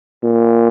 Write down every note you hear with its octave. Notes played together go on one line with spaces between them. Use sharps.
A#2